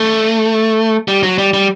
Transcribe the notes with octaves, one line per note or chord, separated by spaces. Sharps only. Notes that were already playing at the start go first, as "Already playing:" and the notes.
Already playing: A3
G3
F#3
G3
G3